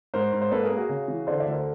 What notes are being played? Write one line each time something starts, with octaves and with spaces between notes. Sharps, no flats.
G#2 A#4 C5
G#2
C5
A#3 A4 B4
G#4 A#4
A#3
F#4 G#4
C#3
E3
D3 C5 D5
D5 E5
D2
A#4 C5